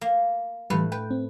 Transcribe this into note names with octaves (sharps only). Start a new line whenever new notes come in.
A#3
A2 E3 G3 B4
B4 G5
C4